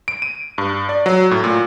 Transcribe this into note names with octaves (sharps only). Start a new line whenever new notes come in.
D7
D#7
G2
D5
F#3
A2
A#2